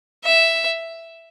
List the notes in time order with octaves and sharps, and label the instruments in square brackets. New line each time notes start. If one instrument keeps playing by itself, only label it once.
[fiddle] E5